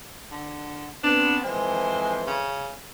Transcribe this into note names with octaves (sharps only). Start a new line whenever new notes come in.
D3
B3 C4 D4
F2 E3 G#3 C5
C#3